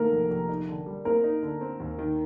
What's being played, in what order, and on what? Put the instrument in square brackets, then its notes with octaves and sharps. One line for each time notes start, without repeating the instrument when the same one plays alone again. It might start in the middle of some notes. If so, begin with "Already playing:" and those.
Already playing: [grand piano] D#3 [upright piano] A3 A#3 A4 A#4
[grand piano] F1
F1
D#4
D3
G3
[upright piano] A#3 A#4 [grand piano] C4
[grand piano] D#4
D3
C4
D#2
D#3